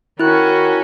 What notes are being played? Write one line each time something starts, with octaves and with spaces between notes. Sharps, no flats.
D#3 C#4 E4 F#4 F#6